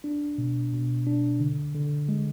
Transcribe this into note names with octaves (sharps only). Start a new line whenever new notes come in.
D4
B2
B2
D4
D3
D3
G#3